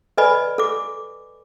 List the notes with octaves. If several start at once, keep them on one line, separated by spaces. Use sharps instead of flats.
A4 B4 D5 D#5 G#5 B5
A4 D6